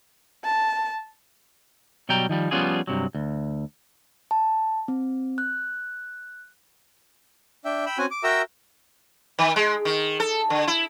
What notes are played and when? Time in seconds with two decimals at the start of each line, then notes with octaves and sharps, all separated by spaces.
0.44 A5
2.09 B2 F#3 G3 G5 A#5
2.29 D#3 F3 G3
2.51 F3 G3 B3 C#4 F4 G#4
2.87 G2 C3 F#3
3.15 D2
4.31 A5
4.88 C4
5.38 F#6
7.65 D4 E5 G5
7.86 G5 B5 E6
7.98 C4 C#4 F#4 F#5 G#5
8.11 D6
8.24 F#4 A#4 E5 G5 A#5 E6
9.39 D#3
9.56 G#3
9.85 D#3
10.20 A4
10.50 D3
10.67 E4